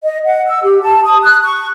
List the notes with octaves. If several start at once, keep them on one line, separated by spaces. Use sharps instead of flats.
D#5
F#5
E6
G4
A5
D#6
F#6
C#6